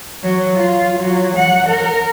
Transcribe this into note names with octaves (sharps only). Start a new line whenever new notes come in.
F#3
F4
F#3
F#5
A#4